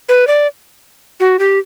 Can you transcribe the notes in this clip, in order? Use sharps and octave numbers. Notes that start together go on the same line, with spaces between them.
B4
D5
F#4
G4